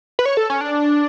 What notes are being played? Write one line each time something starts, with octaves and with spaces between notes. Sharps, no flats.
B4
C#5
A4
C#4
D4